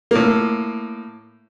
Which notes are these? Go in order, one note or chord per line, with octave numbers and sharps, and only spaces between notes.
A2 A#3